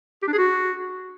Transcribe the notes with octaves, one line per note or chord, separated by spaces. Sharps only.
G4
D4
G#4
F#4